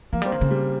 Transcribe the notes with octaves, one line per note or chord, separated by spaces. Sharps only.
F3 A#3
G3 C4
D#3
C#3 A#3
G3